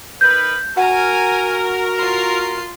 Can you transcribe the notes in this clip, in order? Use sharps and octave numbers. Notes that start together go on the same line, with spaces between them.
D#4 A#4 B4 G6
F#4 A#4 F#5 G#5 A#5
F4 C6